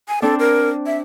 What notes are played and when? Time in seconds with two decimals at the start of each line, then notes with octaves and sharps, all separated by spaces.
0.08 G#5
0.22 C4 D4 A4
0.39 A#4
0.86 E5